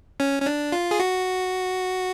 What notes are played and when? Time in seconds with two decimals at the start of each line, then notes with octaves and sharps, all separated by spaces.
0.20 C#4
0.42 C#4
0.46 D4
0.72 F4
0.91 G#4
1.00 F#4